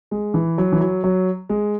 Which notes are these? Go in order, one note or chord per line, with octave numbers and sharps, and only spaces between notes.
G#3
E3
F#3
E3
F#3
F#3
G#3